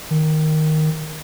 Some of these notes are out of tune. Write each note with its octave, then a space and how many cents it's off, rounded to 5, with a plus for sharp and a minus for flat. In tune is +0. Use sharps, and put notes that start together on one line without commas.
D#3 +0